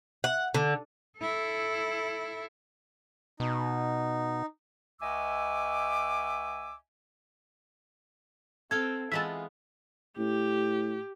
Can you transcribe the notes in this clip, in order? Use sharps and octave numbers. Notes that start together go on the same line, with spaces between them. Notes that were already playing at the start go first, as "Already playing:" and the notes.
F#5
D3
E4 A4
B2 D#4
C#2 D#5 E5 G#5 D6 E6
C4 A4 F5 G5 G#6
E3 G#3 B3 F4 E5 A5
A2 G4